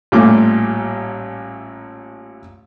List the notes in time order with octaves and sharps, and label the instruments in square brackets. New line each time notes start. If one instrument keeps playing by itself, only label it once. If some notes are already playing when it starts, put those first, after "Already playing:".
[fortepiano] A1 A#2 G3 A3 F5 D6